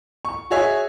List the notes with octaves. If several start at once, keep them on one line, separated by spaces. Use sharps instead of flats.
C#6
F#4 G#4 C#5 E5